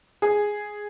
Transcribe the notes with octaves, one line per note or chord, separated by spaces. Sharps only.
G#4